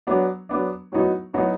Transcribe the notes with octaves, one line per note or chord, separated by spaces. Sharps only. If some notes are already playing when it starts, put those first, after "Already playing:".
F#3 B3 D4
F#3 B3 D4
A2 F#3 B3 D#4 F#4
A2 F#3 B3 D#4 F#4